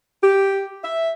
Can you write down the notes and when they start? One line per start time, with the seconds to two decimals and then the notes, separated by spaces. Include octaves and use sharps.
0.23 G4
0.84 E5